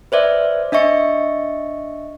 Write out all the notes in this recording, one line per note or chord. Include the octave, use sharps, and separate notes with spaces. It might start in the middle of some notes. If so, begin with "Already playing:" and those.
B4 C5 D5 E5
D4 D#5 E5 C#6 C#7